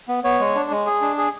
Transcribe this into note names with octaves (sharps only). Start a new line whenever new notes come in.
B3
B3 C#5
G#3
D4
G#3
G#4
D4
G#4